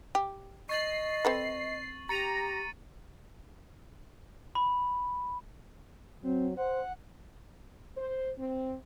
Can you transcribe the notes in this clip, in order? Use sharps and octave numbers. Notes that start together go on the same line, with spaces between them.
G4
D#5 C#6 A6 C7 F#7
C4 A4 B4
G4 A#5 A6 C#7 D#7
B5
F#3 C4
C5 F#5
C5
C4